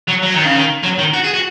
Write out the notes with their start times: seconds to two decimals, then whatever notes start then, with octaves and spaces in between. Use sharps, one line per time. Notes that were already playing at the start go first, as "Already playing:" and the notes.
0.08 F#3
0.23 F#3
0.34 D#3
0.45 C#3
0.55 D#3
0.83 F#3
0.98 D#3
1.13 F#4
1.24 G#4
1.34 F#4